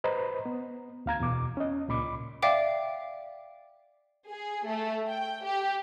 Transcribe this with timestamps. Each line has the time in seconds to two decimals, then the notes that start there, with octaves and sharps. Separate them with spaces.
0.04 B4 C5 D#5 A#5 B5
0.46 B3
1.06 D2 F5 A#5 G#6
1.20 E2 B2 D6
1.57 C#4 D#5
1.88 C#2 A#2 B5 D6
2.42 D5 E5 F5 G5 D6
4.29 G#4
4.67 A3
5.08 G5
5.44 G4